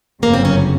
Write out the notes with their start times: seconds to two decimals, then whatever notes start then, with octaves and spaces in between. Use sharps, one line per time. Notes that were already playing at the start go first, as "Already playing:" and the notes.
0.22 G1 F#2 C#3 F#3 A#3
0.34 C4
0.45 C#4